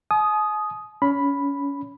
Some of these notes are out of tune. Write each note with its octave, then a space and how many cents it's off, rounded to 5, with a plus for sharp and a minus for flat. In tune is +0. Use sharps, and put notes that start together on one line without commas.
G#5 +45 D#6 +0
C#4 +25 B5 +0